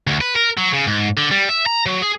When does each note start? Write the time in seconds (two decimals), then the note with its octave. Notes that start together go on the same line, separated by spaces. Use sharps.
0.07 D2
0.21 B4
0.35 A#4
0.57 F#3
0.73 C#3
0.87 G#2
1.18 D3
1.31 G3
1.49 E5
1.66 A#5
1.86 F#3
2.02 G#4